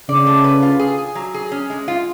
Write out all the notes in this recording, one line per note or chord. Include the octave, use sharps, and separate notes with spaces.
C#3 D5
A3
B4
F4
G#4
G#4
F#3
G#4
C#4
G#3
F4